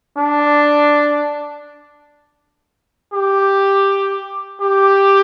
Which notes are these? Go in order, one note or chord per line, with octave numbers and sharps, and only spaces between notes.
D4
G4
G4